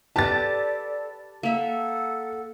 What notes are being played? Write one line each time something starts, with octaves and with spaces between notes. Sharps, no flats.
G4 A4 B4 D5 A5 A6
A#3 A4 E5 F#5